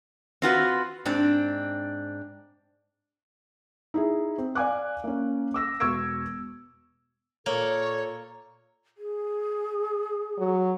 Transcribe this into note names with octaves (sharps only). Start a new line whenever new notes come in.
C4 F4 F#4 B4
G#2 C4 D4
D#4 E4 G#4
C4
D5 F5 G#5 D6 F#6
A#3 C#4
D6 E6 A#6
E1 B2 C#6 E6 G#6 D7
A#2 A#3 A4 C#5
G#4
F#3